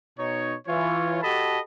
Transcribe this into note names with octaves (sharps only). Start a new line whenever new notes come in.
B2 D#4 C#5
E3 F4 C#5
F#4 G4 A4 D#5 A5 B5